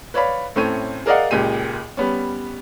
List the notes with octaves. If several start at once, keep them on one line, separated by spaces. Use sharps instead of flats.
B4 C#5 D5 F5 B5
A2 A3 C4 C#4 C#5 D#7
G#4 A#4 D5 D#5 F5 F#5
C#2 A#2 G4 G#4 D#7
G3 B3 C#4